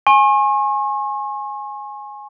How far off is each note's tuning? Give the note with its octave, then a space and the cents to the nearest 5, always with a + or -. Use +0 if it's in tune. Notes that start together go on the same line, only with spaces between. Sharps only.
G#5 +0 C#6 -40